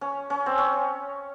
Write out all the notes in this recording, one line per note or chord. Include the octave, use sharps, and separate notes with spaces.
C#4
C#4
C4
C#4